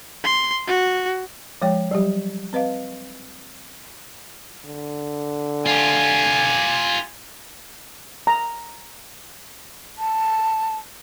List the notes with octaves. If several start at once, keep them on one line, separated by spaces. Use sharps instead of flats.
C6
F#4
F3 G#3 C#5 G5
F#3 G3 G4
C4 B4 D#5 F5
D3
F4 G4 G#5
A#5
A5